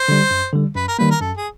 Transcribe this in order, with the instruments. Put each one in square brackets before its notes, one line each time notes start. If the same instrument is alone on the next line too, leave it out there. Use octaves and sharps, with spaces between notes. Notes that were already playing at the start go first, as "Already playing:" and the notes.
Already playing: [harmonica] C5
[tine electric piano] D3 G3
F#2
D3 G3
[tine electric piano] F#2 [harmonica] B4
[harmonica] A#4
[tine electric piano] D#3 G3 A#3 [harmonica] B4
[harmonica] A#4
[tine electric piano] F#2 [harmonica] A4
[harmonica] G#4